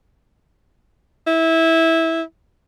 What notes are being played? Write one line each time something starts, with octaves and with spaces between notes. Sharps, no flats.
E4